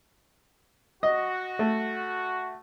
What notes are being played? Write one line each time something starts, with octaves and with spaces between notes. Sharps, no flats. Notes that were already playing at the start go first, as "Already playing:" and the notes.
F#4 D#5
A3